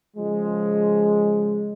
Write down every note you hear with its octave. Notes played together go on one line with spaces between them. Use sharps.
C#3 F3 G#3